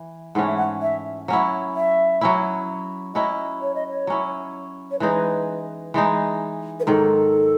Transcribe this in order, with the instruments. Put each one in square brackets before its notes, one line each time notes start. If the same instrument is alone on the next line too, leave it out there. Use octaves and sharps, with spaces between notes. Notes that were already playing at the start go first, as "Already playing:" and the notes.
Already playing: [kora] E3
[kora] G#2 E3 A3 C#4 [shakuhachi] F#5
[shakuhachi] E5
F#5
E5
[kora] F#3 C#4 E4 [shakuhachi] F#5
[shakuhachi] E5
[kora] F#3 C#4 E4
[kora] F#3 C#4 E4 [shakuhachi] D#5
[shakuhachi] C#5
D#5
C#5
[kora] F#3 C#4 E4
[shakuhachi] C#5
[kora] E3 G#3 D#4 [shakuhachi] B4
[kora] E3 G#3 D#4
[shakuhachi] B4
[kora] G#2 D#3 F#3 [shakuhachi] A4